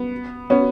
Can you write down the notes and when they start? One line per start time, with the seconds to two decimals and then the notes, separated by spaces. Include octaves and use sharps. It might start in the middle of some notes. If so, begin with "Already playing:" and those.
Already playing: B3
0.50 B3 C#4